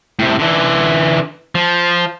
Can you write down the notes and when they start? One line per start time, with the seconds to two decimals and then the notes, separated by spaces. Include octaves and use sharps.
0.19 A2 C3
0.39 D3 E3
1.55 F3